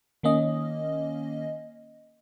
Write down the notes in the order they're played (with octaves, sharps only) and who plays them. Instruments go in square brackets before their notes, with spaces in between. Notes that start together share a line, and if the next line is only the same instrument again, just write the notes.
[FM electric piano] D#3 A#3 C#4 D#5